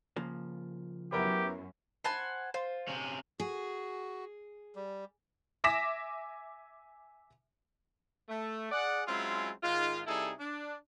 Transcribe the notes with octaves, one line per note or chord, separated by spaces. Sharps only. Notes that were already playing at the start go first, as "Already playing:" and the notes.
C#3 F3 A#3
F#2 B3 E4 G4 A#4
C5 F#5 G#5 A5 B5
F4 C5
C3 C#4
F#4 G#4
G3
E5 G#5 D6 A#6 B6 E7
A3
G#4 D5 F#5
F#3 G#3 C4 C#4 E4 F4
G#2 D#3 G#3 F4
C3 G3 D#4 E4 G#4 A4
D4